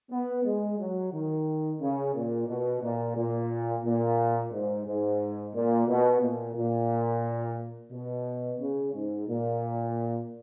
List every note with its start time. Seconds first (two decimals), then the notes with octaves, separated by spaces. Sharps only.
0.11 B3
0.45 G#3
0.79 F#3
1.13 D#3
1.81 C#3
2.15 A#2
2.48 B2
2.82 A#2
3.16 A#2
3.84 A#2
4.52 G#2
4.86 G#2
5.54 A#2
5.88 B2
6.22 A#2
6.56 A#2
7.92 B2
8.59 C#3
8.94 G#2
9.28 A#2